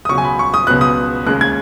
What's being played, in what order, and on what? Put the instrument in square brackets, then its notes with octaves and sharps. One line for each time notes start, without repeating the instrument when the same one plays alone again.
[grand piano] D#6
C#2 B2 F#3 C#6
G#5
B5
C#6
D#6
C#2 B2 F#3 B3 F#6
D#6
D#2 C#3 G#3 F#6
G#6